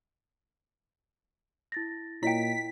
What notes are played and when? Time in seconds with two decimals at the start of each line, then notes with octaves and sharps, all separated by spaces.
1.72 E4 A6 A#6
2.23 A#2 E4 C#5 D#5 G5 B6 D7